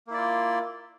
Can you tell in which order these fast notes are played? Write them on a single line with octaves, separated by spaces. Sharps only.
A#3 E4 D5 F4